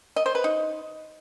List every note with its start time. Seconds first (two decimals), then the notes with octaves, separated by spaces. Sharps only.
0.16 D#5
0.26 C5
0.35 B4
0.44 D#4